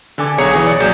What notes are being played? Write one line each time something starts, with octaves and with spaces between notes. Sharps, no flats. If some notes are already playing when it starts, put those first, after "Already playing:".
D3 A4 G#5 D6
B1 G#4 C#5 A#5 G#6 C#7
E3 G#4
D5 C#7
A#1 F#3 G#4 G6